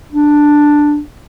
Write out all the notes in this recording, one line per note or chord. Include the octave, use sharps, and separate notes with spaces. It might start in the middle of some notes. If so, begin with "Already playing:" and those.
D4